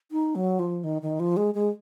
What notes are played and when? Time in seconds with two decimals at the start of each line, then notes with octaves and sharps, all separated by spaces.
0.11 D#4
0.35 F#3
0.59 F3
0.84 D#3
1.02 D#3
1.20 F3
1.37 G#3
1.54 G#3